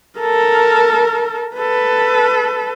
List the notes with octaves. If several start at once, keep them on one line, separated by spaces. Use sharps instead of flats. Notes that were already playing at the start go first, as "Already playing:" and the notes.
A4 A#4
A4 B4